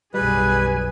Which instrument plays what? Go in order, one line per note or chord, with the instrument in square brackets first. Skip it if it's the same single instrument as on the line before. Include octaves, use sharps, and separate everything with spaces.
[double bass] B1 F#2 [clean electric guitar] G3 [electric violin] G#4 G#5 [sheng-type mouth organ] B4